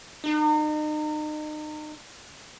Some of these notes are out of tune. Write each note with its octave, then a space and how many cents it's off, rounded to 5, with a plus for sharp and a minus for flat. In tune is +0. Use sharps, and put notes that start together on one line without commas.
D#4 -35